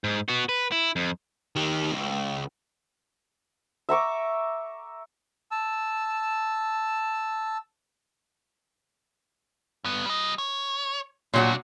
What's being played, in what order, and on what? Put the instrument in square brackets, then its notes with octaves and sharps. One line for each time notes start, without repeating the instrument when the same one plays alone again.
[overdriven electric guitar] G#2
B3 F#4
B4
E4
F2
[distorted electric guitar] D#3 G4
C#2
[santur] E5 A#5 C#6 D6
[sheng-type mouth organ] A5 E6
[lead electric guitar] G2 B3
G3 D#5
C#5
[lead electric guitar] C2 D4 [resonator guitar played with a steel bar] A#2 F#3 F#4